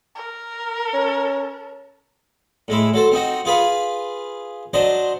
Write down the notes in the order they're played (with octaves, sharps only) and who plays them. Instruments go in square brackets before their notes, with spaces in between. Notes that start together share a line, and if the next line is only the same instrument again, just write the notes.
[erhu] A#4
[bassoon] C#4
[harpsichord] A2 G#3 E4
F#3 A4 C5
C4 D#4 F#4
F4 G#4 B4 F5
F#3 D4 C5 D#5 C6